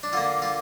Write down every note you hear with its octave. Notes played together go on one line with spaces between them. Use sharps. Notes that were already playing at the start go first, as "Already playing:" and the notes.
D4
D3 A#3 F4
F4